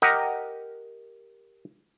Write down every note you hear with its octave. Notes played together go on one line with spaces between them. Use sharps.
G4 A#4 D#5 F#5